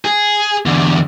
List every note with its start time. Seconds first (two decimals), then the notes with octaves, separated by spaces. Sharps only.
0.05 G#4
0.66 E2 D3